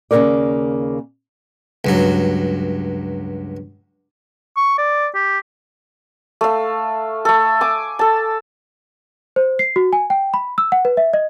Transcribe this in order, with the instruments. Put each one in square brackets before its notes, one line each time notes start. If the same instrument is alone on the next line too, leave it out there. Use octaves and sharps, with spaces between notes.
[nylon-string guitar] D#2 C#3 E3 A#3 A#4 D5
[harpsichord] C#2 G2 F#3
[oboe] C#6
D5
G4
[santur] A3 F5
A3 A4
G#5 D6
A4 A5
[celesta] C5
C7
F#4
G#5
G5
B5
E6
F#5
B4
E5
D#5